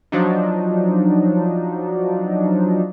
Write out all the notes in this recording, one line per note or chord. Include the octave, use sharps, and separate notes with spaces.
F3 F#3 D4 D#4